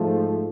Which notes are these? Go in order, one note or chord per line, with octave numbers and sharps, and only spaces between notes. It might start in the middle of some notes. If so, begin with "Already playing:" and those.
Already playing: G#2 F3 A3